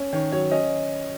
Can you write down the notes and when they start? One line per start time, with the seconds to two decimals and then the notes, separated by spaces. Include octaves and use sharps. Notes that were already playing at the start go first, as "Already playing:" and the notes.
Already playing: C#4
0.13 D#3 C#5
0.32 F#3 C#5
0.51 C#4 D#5